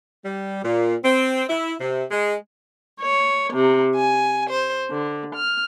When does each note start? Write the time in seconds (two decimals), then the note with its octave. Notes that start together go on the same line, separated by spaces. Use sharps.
0.25 G3
0.64 A#2
1.03 C4
1.49 E4
1.80 C3
2.11 G#3
3.00 C#5
3.53 C3
3.97 G#5
4.50 C5
4.90 D3
5.35 F6